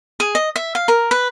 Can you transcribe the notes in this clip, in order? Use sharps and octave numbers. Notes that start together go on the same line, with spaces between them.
G#4
D#5
E5
F5
A#4
B4